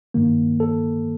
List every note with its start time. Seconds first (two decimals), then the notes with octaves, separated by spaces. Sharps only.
0.14 G2 D#3 A#3
0.60 A4